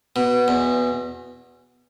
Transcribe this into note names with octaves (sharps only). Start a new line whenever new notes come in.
B2
E2